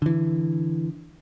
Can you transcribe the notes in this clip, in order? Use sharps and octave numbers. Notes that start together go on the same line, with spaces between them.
D3 E3